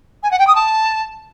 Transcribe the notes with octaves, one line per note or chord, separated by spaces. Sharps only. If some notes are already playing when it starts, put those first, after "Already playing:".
G#5
F#5
G5
D#6
A5